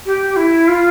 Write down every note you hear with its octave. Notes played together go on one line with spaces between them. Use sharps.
G4
E4
F4